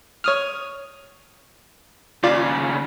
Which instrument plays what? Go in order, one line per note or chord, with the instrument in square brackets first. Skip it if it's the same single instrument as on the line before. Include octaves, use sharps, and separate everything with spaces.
[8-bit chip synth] C#5 D#6 F6
[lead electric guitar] D#2 C#3 [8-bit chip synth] F4 D5